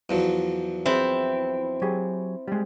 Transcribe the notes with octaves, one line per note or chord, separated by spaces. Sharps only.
E2 F3 F#3
C4 E4 G#4 B4 E5
F#3 G4 G#4
G3 G#3